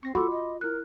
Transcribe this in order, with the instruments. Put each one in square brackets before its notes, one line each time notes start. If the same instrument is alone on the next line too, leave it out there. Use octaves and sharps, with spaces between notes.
[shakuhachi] C4 [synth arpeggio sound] C#6 A#6 C7
[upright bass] F4 [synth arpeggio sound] F#4 [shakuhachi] A4 [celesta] B5 C6 D6
[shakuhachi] D#5
[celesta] E4 F#6 [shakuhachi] A#4